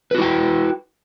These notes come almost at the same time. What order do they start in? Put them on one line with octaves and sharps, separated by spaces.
B4 F#4 E4 G5